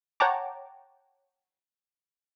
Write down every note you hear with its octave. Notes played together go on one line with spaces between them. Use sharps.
C#5 F#5 G5 A5 A#5 D6